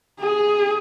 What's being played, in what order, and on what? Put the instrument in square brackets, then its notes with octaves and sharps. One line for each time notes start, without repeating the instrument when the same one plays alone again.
[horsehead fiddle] G#4